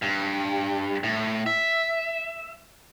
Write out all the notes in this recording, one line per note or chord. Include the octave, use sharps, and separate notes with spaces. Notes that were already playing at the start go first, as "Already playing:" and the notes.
G2
A2
E5